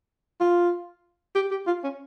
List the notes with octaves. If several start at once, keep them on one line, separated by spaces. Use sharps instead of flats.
F4
G4
G4
F4
C#4